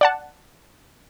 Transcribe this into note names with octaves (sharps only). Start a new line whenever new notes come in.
D5 F#5 A5